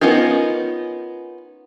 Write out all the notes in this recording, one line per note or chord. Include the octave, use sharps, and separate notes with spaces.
B3 C#4 D#4 F4 A#4